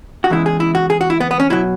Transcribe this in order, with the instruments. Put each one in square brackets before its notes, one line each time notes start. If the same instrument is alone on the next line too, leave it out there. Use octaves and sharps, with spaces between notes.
[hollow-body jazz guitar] F#4
E2 C#3 E3 G#3 E4
G#4
E4
F#4
G#4
F#4
E4
B3
B3
C#4
B2 F#3 E4